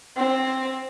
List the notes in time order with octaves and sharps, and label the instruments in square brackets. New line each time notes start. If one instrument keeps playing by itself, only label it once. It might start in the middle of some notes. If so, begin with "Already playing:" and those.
[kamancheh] C4